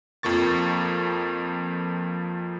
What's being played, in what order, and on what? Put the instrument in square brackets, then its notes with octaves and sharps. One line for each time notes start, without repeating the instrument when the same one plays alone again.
[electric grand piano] F2 F3 A#3 C#6 A6